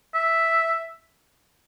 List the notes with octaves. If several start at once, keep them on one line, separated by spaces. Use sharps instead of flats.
E5